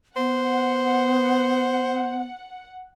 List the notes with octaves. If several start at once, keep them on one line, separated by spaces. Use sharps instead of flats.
B3 C5 F#5